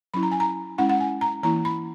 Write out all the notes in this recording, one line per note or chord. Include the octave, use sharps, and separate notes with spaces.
F#3 C#4 E4 B5
A#5
G#5
A#5
G#3 C#4 E4 F#5
F#5
G#5
A#5
E3 A#3 E4 A#5
B5